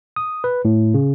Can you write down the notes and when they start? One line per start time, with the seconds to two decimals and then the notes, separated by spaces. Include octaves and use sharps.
0.16 D#6
0.44 B4
0.65 A2
0.94 C#3